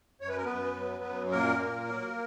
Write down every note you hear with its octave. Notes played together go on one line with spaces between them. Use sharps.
F#2 C#5
B4
A#4
F#2 B3 B4
F#3
F#2
A#2 A#3 A#4
A#2
F#3